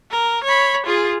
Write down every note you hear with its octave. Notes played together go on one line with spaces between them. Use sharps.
A#4
C#5 B5
F4 G#4